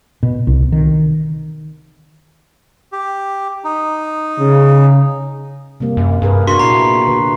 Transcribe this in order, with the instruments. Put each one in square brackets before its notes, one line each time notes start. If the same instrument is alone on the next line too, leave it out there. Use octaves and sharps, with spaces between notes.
[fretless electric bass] B2
C2
D#3
[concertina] G4
D#4
[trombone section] C#3
[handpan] C3 G3 A#3
[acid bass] F#2
[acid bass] G2 [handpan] G#4 A#4 B4
[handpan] B3 D4 [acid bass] F#4 [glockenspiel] C6 C#6 B6
[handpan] A#2 E4 [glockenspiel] A#5 C7
[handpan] D3 B4